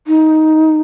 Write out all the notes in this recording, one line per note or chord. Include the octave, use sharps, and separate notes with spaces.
D#4